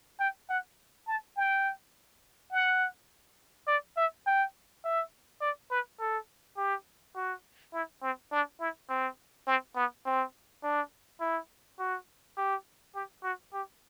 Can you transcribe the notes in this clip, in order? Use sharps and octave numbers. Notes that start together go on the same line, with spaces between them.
G5
F#5
A5
G5
F#5
D5
E5
G5
E5
D5
B4
A4
G4
F#4
E4
C4
D4
E4
C4
C4
B3
C4
D4
E4
F#4
G4
G4
F#4
G4